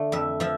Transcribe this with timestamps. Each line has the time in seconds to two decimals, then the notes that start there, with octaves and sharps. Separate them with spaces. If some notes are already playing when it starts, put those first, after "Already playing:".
Already playing: D3 A3
0.12 F2 E5
0.40 F3 E5